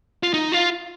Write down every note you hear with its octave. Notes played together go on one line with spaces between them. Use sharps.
F4
D#4
F4